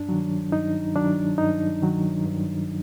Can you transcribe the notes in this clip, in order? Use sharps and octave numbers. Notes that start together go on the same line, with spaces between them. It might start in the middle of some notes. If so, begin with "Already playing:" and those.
Already playing: G2 D4
D#3 F#3
G2 D#4
D#3 F#3 D4
G2 D#4
D#3 F#3
G2